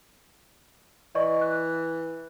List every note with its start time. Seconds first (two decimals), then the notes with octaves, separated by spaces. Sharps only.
1.15 E3 D5 D#5 C#6
1.41 F#6